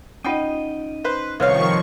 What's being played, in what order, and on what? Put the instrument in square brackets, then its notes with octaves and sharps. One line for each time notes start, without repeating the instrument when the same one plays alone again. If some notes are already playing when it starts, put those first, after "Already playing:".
[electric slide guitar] C#4 D#4 D#5 [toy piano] F4 F#5 D#6 [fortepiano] G5
[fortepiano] B4 C5
[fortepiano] C2 F5 [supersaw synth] D#3 F3 C#6 [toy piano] A4 B4 C#5